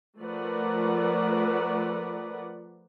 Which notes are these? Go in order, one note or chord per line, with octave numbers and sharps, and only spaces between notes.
F3 A3 A#4 B4 D5 F#5